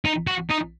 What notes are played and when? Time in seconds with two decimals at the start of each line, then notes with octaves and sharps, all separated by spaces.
0.05 D#4
0.27 F#4
0.50 D#4